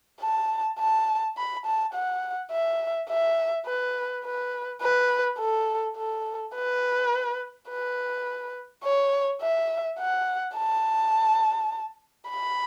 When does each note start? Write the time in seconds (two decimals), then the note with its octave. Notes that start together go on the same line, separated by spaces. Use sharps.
0.22 A5
0.79 A5
1.37 B5
1.66 A5
1.94 F#5
2.52 E5
3.10 E5
3.66 B4
4.25 B4
4.82 B4
5.39 A4
5.97 A4
6.55 B4
7.70 B4
8.84 C#5
9.42 E5
9.99 F#5
10.57 A5
12.30 B5